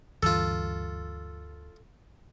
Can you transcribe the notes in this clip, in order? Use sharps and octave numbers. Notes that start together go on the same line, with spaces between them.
D2 G2 E3 F4 A4